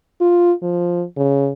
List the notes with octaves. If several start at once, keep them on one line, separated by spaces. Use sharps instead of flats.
F4
F3
C#3